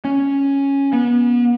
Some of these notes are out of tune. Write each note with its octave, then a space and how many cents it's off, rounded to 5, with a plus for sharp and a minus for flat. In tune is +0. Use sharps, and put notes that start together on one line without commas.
C#4 +0
B3 -35